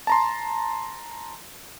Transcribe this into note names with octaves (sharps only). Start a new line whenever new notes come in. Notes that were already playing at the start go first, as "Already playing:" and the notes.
A5 A#5 C6